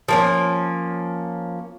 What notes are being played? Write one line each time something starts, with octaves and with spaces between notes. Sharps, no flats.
F3 A#3 C#4